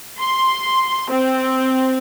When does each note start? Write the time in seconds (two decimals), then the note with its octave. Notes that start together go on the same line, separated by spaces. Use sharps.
0.19 C6
1.09 C4